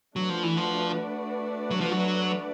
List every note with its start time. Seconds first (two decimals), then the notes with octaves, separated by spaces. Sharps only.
0.15 F#3 A3 D4 F#4 B4 D5
0.29 F3
0.43 E3
0.57 F3
1.71 F#3
1.81 F3
1.91 F#3